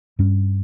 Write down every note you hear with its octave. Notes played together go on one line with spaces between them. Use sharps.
G2 G3 C#4